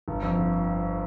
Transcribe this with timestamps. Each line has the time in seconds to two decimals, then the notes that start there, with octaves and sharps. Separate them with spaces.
0.08 G1
0.23 F2
0.38 G1